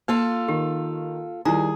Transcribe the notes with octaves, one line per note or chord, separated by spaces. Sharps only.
A#3 F4 A4 F5
D#3 G4
D#3 G3 E4 F4 G#4 A#5